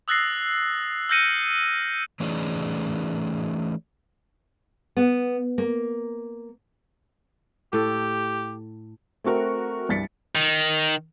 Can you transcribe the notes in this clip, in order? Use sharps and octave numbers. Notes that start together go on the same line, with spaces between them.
D#6 E6 F#6 A6 A#6 C7
E6 F6 G6 A#6 C#7 D#7
E3 A3 C#4 D#4 G#4 D5
B3
A#3
A2 G4 A4
A3 C4 F#4 A#4
C2 G2 A6 B6 C#7
D#3